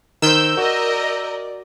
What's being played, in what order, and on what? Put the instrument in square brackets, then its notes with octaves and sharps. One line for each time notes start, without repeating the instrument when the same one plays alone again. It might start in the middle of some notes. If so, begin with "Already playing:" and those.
[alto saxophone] D#3 [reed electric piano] A#4 C5 [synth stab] E6 G6
[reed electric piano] F#4 [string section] A#4 D#5 [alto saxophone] D5